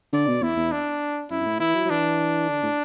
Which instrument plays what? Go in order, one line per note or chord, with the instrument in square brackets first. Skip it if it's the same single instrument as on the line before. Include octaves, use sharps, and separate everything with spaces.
[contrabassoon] D3 [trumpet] D5
[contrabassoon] B2
[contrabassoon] E2 [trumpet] E4
[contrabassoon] E2
[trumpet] D4
[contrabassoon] F#2 [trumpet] E4
[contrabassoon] F#2
A2
[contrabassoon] E3 [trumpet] E4
[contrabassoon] F#3
F#3
[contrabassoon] E3 [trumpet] D4
[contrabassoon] D3
A2